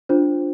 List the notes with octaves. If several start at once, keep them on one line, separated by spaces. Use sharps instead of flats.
D4 F4 C5